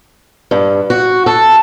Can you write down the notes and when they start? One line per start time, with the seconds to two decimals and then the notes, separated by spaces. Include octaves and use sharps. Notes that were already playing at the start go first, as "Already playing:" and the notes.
0.51 G2
0.90 F#4
1.26 A4